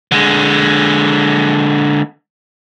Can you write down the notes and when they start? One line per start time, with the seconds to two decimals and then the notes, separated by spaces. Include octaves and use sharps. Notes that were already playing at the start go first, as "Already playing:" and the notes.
0.12 D3 G#3